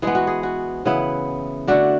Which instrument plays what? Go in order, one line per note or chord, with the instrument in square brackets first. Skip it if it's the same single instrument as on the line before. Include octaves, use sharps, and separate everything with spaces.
[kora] E3 G#3 B3 G#4
F#4
G#4
F#4
C#3 E3 B3 E4
D3 A3 D4 F#4